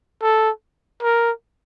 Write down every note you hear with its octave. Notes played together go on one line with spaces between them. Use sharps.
A4
A#4